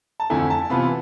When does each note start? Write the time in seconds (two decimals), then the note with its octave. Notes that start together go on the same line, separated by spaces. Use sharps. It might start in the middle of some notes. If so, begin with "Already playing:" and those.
0.20 A5
0.30 F2 D3 A3 E4 G#5
0.50 A5
0.70 C3 E3 B3 F4 B5